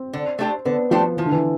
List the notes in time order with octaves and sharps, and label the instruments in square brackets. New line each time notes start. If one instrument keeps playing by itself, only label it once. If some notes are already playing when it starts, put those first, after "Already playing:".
Already playing: [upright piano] C4
[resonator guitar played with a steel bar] D3
A3 D4 G4 C5
[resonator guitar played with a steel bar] D3 [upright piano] B3
[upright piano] F3 [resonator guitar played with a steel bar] A3 D4 G4 C5
[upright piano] E3 [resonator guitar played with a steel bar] F3
[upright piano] D3
E3